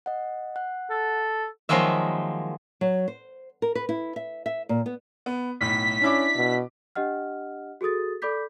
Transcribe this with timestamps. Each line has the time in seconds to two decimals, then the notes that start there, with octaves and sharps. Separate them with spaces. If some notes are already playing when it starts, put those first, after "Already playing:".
0.06 D#5 F#5
0.56 F#5 F#6
0.90 A4
1.69 D#3 F3 F#3 G#3 A#3 E5
2.81 F#3
3.08 C5
3.62 A#4
3.75 B4
3.89 E4
4.16 E5
4.46 E5
4.69 A#2
4.86 B3
5.26 B3
5.61 B1 A2 B6
6.02 C#4 D4 E4 D6
6.36 B2
6.95 D4 G4 D#5 F#5 F6
7.81 F#4 G#4 A4 D#6 A6
8.22 A4 D5 B5 D6 G6 B6